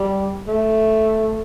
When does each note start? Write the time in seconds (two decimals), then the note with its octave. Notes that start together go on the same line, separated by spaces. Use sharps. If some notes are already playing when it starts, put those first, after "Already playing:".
Already playing: G3
0.48 A3